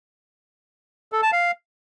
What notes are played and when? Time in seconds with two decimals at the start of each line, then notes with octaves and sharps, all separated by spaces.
1.12 A4
1.22 A5
1.33 F5